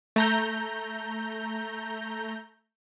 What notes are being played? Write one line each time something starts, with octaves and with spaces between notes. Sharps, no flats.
A3 A#5 G6